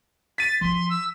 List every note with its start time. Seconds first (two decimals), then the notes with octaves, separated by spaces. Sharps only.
0.38 A6 B6 D#7
0.61 F3 E4 C6
0.90 E6